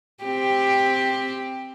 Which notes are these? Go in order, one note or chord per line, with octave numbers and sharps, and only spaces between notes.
C4 G4